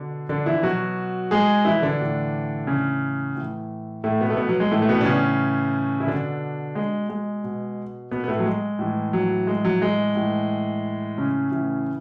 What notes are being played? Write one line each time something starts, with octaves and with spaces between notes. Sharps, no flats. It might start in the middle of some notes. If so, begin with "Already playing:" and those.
Already playing: B2 D3 D4
D3 D4
E3 E4
B2 F#3 F#4
G#3 G#4
E3 E4
D3 D4
A2 E3
C#3 C#4
A2 E3
A2 A3
B2 B3
A3
B2 B3
F#3
G#3
A2 E3 A3
A3
B2 B3
D4
C#3 C#4
E4
B2 D3 D4
G#3
G#3
B2
B2 B3
B3
A2 A3
F#3
G#3
A2 E3
F#3
G#3
F#3
G#3
A2 E3
C#3 C#4
A2 E3